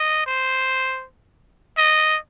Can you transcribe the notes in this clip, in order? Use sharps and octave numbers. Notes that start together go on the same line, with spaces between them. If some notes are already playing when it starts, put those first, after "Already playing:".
Already playing: D#5
C5
D#5